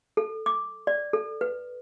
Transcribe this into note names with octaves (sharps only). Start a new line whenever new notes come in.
A4
D6
D5
A4
B4